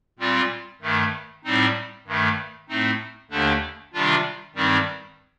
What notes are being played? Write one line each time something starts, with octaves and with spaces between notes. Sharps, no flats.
A#2 G3 C4 F4
G2 D#3 A3
A2 G3 C4 D#4
G2 D#3 A3
A2 A3 C4 D#4
D#2 D3 A3 D4
C3 D#3 G3 D4 F4
G2 D#3 G3 C4 D#4